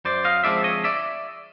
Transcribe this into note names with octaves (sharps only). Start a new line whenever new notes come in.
F#2 C5 D5
D#5 F5
D3 F3 G#3 C4 D5 E5
C#5 D#5
D5 E5